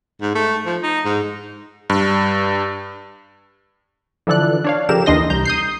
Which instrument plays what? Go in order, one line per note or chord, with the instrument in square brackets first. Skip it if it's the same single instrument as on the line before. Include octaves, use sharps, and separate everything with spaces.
[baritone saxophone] G#2
A3
F3
D#4
G#2
[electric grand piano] G2
[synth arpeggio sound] D3 E3 F3 A4 D5 F#6
D4 C#5 F5
C#3 F3 G4 A4 A#4 E7
D#2 E3 D4 D#5 C6 A#6
C2 A#5 G6
D#6 G6 C7